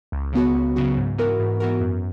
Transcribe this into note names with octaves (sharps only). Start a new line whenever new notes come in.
C#2
C#3 F#3 B3 F#4
C#2
C#3 F#3 B3 F#4
G#2
E3 B3 F#4 A#4
G#2
E3 B3 F#4 A#4
F#2